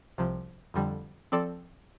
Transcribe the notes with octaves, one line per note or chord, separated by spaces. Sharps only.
C2 C3 F3
F2 D3 G3
F3 C4 A4 D5